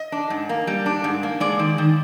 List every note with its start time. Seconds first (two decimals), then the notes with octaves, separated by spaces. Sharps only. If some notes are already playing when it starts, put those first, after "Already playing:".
Already playing: D#5
0.12 D4
0.30 G#2
0.49 A#3
0.67 G3
0.86 D4
1.04 G#2
1.23 A#3
1.40 G#3 D5
1.59 D#3
1.78 D#3